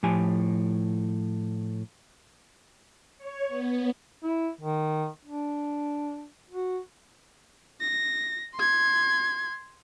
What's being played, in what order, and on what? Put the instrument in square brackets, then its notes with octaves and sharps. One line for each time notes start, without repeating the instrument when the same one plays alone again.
[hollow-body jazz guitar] A2 F3 G4 G#5
[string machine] C#5
B3
[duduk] E4
D#3
D4
F#4
[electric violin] A#6
C6 G#6